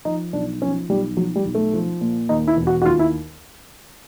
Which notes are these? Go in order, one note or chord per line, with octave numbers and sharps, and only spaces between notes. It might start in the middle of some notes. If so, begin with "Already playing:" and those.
F3 D#4
B1 D4
F3 C#4
B1 G3
F3 F#3
G3
B1
A3
F3
A#2
D#2 D#4
E4
E1
F#4
F#4
D#2 F4
E4